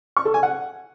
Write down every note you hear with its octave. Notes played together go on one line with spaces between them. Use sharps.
C#6
A4
G#5
F#5